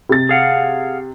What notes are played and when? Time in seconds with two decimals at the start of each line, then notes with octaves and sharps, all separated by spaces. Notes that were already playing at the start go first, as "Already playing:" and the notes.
0.09 C3 A6
0.29 G#4 F5 F#5